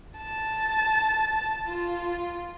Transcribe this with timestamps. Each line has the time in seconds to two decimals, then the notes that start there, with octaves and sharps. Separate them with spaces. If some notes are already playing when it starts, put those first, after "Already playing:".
0.17 A5
1.67 F4